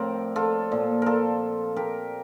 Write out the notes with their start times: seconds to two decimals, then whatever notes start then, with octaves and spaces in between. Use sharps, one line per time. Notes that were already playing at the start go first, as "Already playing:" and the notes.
Already playing: A2 F3 C4 A#4 C5 D5
0.36 F4 A4
0.71 A#2 F3
1.02 F4 A4 A#4
1.76 G4 A#4